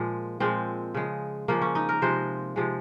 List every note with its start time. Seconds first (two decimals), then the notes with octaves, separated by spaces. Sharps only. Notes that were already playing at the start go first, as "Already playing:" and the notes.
Already playing: A#2 F3 G#3
0.40 A#2 F3 G#3 C4
0.94 C#3 F3 G#3
1.48 C#3 F3 G#3 A#3
1.62 C#4
1.75 D#4
1.89 A#4
2.02 C3 F3 G#3 C5
2.56 C3 F3 G#3